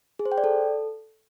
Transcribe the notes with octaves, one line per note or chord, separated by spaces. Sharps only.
G#4
C5
G5
D5
A4